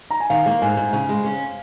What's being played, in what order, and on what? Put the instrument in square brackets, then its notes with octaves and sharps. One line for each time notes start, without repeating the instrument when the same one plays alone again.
[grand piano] A#5
G#5
[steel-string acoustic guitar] D#3 [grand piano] F5
[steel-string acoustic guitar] A#3
[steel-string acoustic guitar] G#2 [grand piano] G#5
[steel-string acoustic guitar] G#2
C#3
G#3
C#4